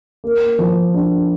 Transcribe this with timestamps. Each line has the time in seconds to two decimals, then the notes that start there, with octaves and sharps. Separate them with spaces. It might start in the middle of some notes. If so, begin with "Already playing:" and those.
0.24 A#3
0.59 F3
0.94 D4